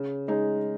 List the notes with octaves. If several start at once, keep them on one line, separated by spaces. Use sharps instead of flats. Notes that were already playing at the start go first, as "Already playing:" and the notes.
Already playing: C#3
G#3 D#4 G#4